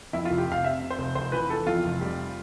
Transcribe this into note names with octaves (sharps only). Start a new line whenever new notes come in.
F2 E4
F1 F4
G4
F1 F5
C3 E5
C3
C5
F1
F1 C5
E3 B4
E3 A4
F2 F4
F1
G3